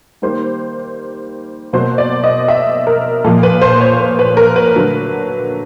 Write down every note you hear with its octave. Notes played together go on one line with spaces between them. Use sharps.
D#3 G3 A#3 C5
B2 F#3 A#3 C5
D5
D#5
E5
A#4
A#2 F3 A#3 A4
B4
C5
C#5
C5
B4
A#4
B4
D3 F#3 A3